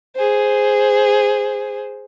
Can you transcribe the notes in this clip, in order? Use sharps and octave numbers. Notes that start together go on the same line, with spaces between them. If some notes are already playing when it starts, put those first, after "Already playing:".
G#4 C5